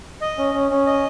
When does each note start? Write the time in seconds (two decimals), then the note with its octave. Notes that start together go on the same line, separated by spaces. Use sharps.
0.21 D#5
0.38 C#4
0.54 C#4
0.71 C#4
0.87 D#5